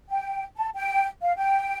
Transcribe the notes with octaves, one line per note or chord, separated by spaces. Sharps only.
G5
A5
G5
F5
G5